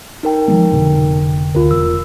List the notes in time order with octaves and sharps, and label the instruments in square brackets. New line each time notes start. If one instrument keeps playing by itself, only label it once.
[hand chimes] D#4 A#4 G5
[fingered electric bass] F3 G#3 A#3
F1 B2 D3
[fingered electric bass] D2 [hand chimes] F4 A#4
[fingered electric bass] E1 [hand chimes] E6